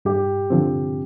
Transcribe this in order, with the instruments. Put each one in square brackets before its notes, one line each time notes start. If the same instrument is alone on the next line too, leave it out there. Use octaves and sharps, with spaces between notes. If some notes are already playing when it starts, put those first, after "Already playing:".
[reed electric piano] G2 [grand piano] G4
[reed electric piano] D3 F3 C4